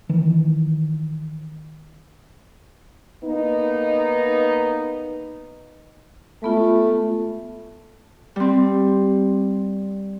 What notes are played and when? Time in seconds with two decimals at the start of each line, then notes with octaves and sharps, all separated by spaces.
0.09 D#3 E3
3.24 A#3 B3 D#4
6.43 G#3 A3 B3 F4
8.36 G3 C4